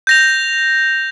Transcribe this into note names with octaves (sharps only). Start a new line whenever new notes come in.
G6 A#6 F7